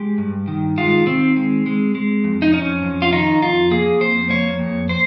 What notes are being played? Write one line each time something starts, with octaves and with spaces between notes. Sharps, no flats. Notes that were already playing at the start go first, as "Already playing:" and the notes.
Already playing: G#3 G4
G2
D#3
G#3 F4
D#3 C4
G#3
G#3
G#3
F2
D#4
F2 C#4
F2
F4
D#3 D#4
F2 F4
A#3 G#4
F2 C5
A#3 C#5
F2
C5